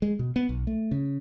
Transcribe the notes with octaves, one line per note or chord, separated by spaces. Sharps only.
G#3
B2
B3
B1
A3
C#3